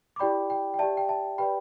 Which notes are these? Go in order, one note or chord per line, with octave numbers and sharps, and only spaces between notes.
D6
E4 G4 D5 G5 B5
G5
G5
G4 D5 E5 A5
G5
E5 A5
G4 B4 D5 G5 B5